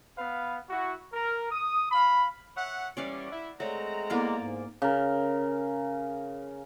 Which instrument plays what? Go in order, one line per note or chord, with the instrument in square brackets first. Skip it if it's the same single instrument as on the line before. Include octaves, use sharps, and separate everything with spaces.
[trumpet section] B3 B4 F5
E4 F#4
A#4
D#6
F5 B5
[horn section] C#5 E5 F#5
[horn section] E3 G3 C#4 [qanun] D5 F5 F#5
[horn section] E4
[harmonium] G#3 [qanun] A3 [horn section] C4 F#5 A#5 [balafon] C#5 D5
[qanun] A#3 D5 F5 [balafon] B3 E4 A4
[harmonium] G#2
[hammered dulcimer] C#3 A#4